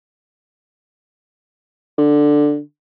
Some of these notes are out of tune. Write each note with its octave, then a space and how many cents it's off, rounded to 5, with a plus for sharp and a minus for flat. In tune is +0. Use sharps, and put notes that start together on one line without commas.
D3 +5